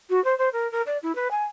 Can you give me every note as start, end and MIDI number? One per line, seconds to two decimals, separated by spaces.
0.10 0.23 66
0.24 0.37 72
0.38 0.49 72
0.53 0.70 70
0.72 0.82 70
0.86 0.97 74
1.03 1.15 64
1.15 1.28 71
1.31 1.44 80